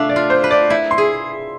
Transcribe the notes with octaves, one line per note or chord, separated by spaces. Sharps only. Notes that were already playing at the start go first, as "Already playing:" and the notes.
Already playing: A3 D4 E5 F5 A5
D5
F4
C5
B4
D5
E4 E5
C6
G#4